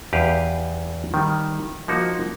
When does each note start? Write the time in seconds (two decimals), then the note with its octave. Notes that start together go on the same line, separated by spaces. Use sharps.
0.13 E2 G4 B4 F5
1.14 D#3 G3
1.88 F3 A#3 D#4 F#4